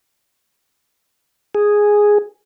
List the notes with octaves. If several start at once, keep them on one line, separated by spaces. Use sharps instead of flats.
G#4